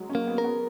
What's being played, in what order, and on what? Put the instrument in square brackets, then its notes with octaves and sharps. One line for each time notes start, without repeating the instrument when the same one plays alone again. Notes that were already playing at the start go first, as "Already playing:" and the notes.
Already playing: [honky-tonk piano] F#3 G#3
C#4
[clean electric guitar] A#3
[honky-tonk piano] B3
[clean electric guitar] A#4
[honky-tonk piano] B3